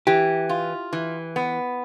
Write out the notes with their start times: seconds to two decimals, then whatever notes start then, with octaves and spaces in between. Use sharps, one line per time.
0.07 E3 G4
0.49 F4
0.93 E3
1.36 B3